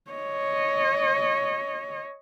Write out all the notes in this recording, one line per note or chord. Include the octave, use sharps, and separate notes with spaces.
C#5 D#5